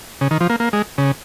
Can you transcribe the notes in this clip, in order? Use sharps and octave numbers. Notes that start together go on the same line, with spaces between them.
C#3
D#3
F3
A#3
A#3
G#3
C#3